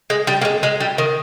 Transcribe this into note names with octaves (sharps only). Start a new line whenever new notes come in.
G#3
G3
A#3
G#3
G#3
G3
D#3